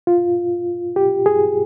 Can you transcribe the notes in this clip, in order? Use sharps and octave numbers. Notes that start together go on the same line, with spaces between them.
F4
G4
G#4